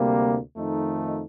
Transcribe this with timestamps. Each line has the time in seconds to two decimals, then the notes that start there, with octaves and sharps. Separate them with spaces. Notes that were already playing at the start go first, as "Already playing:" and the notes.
Already playing: D2 C3 G3 A#3
0.55 F2 D#3 A3 D#4